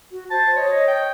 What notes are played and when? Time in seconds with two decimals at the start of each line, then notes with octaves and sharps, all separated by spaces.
0.12 F#4
0.30 C5 A5
0.56 C#5 D#5
0.88 G5